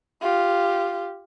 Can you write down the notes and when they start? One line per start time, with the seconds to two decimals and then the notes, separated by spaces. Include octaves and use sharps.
0.22 F4 G4